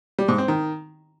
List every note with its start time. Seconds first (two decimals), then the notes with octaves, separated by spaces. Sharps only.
0.19 G3
0.28 G#2
0.38 C4
0.48 D#3